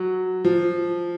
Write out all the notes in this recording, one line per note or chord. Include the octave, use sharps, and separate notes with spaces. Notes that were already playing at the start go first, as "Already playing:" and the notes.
Already playing: F#3
F3